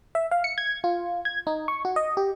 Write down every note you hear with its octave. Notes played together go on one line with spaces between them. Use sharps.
E5
F5
C#7
G#6
F4
G#6
D#4
C#6
F#4
D#5
G4